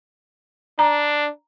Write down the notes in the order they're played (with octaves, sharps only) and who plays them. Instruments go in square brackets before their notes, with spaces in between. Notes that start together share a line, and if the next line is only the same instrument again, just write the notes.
[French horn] D4 [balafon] A#5